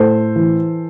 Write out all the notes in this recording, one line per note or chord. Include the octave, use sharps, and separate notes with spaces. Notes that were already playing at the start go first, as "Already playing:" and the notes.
Already playing: A2 A4 C5
E3